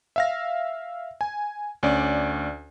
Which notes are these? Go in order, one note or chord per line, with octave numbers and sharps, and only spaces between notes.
E5 F5 A#6
G#5
D2 C#4 D5